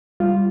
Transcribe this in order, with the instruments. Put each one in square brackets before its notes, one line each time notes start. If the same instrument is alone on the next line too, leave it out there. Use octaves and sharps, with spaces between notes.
[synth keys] G3 [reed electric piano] F4